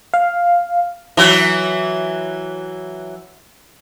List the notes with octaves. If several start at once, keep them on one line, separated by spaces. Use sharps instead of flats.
F5
E3 F#3 F#4